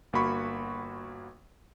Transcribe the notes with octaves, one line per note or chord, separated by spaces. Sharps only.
G1 A#3 F#4 B5 C#6